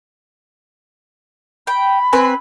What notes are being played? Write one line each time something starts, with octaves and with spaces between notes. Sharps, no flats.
G5 B5
C4 B4 G#5